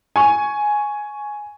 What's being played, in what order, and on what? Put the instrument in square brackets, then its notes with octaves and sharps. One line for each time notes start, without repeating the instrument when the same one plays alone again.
[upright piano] G#5 C#6